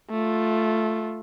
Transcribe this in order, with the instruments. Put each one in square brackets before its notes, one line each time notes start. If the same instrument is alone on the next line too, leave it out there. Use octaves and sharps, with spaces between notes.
[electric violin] A3 F4